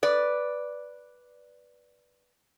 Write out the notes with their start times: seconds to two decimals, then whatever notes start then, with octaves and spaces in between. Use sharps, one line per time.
0.03 B4 D5